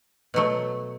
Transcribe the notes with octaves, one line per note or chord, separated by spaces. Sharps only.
B2 F#3 A3